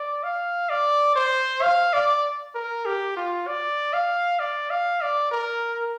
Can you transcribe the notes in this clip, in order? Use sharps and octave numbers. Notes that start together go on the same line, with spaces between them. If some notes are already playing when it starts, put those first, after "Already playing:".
Already playing: D5
F5
D5
C5
F5
D5
A#4
G4
F4
D5
F5
D5
F5
D5
A#4